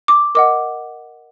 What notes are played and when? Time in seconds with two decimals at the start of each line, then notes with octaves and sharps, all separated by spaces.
0.08 D6
0.35 A#4 D#5 F#5 D6